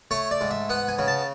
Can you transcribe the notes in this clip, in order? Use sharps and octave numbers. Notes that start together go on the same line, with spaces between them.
A3 C#5
D5
G#2
E5
B3 F#5
G#5
C#3
A5